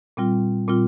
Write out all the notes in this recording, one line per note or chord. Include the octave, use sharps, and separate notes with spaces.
A#2 G3 C4 F4
A#2 G3 C4 F4